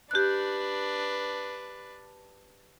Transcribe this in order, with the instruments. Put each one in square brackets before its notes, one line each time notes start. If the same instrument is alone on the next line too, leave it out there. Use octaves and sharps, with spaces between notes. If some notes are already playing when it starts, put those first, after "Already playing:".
[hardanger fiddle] D4 B4 [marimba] G4 F#6